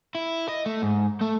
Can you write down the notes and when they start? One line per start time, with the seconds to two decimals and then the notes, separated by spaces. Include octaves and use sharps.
0.15 E4
0.49 D#5
0.66 A3
0.82 G#2
1.21 A3